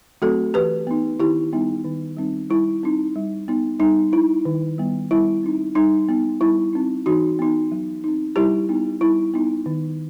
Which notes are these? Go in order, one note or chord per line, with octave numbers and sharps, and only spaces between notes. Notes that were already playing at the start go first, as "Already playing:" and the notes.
F#3 A3 C4 F#4 A4
E3 G4 B4
B3 D#4
D#3 E4 G4
G3 B3 D#4
D#3
G3 C4 D#4
G3 E4
C4 D#4
G3
B3 D#4
G3 D#4
D#4 E4
D#3
G3 B3
G3 E4
C4 D#4
G3 D#4
B3 D#4
G3 E4
C4 D#4
E3 D#4 F#4
B3 D#4
F#3
C4 D#4
G3 E4 G4
B3 D#4
G3 E4
B3 D#4
D#3